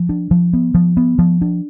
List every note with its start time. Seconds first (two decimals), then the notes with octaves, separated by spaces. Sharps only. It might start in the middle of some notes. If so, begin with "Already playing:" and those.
Already playing: F3
0.09 D4
0.31 F3
0.53 B3
0.75 F3
0.97 B3
1.19 F3
1.42 D4